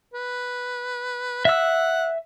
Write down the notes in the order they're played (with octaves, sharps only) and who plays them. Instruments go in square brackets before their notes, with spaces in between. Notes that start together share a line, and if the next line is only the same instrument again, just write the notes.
[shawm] B4
[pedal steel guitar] E5 E6 [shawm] F#5